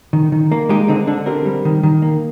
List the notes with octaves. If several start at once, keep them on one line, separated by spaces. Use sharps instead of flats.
D#3
D#3
A#3
G#3 D#4 G4
D3 C4 D#4
D3 D4
C4 G4 A#4
G3
D#3
D#3
A#3